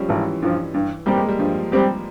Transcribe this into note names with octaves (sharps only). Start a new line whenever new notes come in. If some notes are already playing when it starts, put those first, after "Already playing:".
Already playing: F3 G3 G#3 C#4
G#1 E3
G2 F3
G2
G3 A#3 C4 G4
G#3
G3
G2 F3
G3 C4 G4